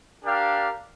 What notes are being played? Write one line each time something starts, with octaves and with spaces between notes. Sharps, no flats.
D4 G4 A#4 D5 F5